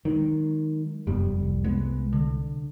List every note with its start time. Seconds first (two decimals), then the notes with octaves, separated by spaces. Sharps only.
0.05 D#3 F#3 G#3
1.07 F1 F#2 G3 B3
1.39 C2
1.64 G#3 B3
2.13 D3